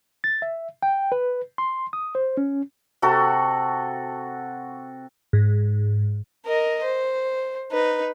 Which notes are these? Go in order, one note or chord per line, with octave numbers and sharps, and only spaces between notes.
A6
E5
G5
B4
C6
D#6
C5
C#4
C3 F#4 A4
G#2
A#4 D#5
C5
D#4 B4